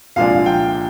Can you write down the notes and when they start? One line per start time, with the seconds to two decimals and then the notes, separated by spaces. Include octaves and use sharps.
0.16 C2 A#2 F3 G#3 D4 F5
0.46 G5